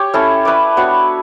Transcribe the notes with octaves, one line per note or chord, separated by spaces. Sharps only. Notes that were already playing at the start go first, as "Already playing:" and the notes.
Already playing: G4 C#5
C#4 E4 A4
E4 B4 D5
B3 D4 F#4 C#5